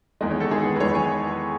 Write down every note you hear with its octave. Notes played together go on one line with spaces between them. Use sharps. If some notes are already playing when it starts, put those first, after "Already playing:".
E2 D#3 G#3 D#5
C#5
A4
E2 D#3 G#3 G#4
B4
B4
E2 D#3 G#3 C#5
G#5